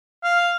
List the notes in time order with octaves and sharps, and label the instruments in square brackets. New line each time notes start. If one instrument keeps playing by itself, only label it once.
[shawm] F5